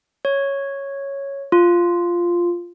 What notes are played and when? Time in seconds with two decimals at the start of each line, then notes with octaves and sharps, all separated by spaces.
0.25 C#5
1.52 F4